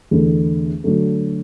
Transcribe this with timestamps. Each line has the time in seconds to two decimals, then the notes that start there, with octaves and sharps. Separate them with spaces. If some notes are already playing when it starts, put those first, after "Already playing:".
0.11 E2 D3 A3
0.84 D3 F#3 A3